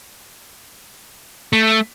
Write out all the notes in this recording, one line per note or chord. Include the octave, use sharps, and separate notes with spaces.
A3